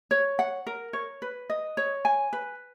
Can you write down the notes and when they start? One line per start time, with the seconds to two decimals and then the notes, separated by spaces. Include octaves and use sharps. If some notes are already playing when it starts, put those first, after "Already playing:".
0.11 C#5
0.39 F#5
0.67 A#4
0.93 C#5
1.22 B4
1.50 D#5
1.77 C#5
2.05 G#5
2.33 B4